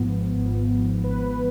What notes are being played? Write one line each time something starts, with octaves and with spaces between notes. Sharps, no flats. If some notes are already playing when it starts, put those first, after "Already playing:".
Already playing: G#1 G#2 F3 B3
G#1 G#2 F3 B3
G#1 G#2 F3 B3 B4